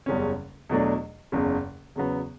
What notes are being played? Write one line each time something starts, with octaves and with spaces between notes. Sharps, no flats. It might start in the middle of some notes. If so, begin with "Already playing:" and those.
F#1 E2 C#3 G3 C#4
E2 B2 F#3 A3 D4
F#1 E2 C#3
E2 C#3 F#3 B3